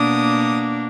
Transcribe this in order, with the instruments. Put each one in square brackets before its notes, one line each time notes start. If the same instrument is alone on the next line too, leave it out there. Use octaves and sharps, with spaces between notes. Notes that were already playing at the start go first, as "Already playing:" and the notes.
Already playing: [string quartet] B2 A#3 D4 D#6